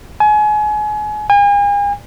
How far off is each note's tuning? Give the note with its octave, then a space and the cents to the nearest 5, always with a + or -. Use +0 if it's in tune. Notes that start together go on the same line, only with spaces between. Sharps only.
G#5 +30
G#5 -40